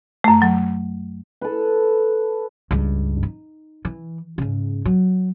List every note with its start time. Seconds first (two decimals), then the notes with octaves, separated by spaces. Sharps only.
0.24 F#2 A3
0.42 F#3
1.41 A4 B4
2.71 C#2 G2
3.23 D#4
3.85 E3
4.38 G#2 C#3
4.85 F#3